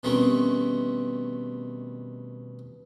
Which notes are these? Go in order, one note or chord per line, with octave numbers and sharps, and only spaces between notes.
B2 D#3 G3 A3 C4 C#4